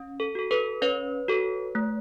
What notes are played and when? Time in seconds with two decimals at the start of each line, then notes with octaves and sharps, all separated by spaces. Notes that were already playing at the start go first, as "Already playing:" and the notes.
Already playing: C#4
0.20 A4
0.35 F#4 A4
0.51 A4 B4
0.82 C#4 B4 C#5
1.28 F#4 A4
1.75 A3